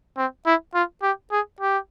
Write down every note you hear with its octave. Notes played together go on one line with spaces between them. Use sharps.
C4
E4
F4
G4
G#4
G4